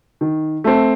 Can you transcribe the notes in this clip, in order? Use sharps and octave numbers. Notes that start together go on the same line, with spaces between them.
D#3
A3 C4